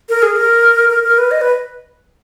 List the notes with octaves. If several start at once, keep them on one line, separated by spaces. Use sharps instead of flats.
A#4
G#4
A#4
A#4
A#4
B4
D#5
B4